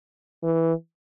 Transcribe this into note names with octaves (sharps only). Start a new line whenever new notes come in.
E3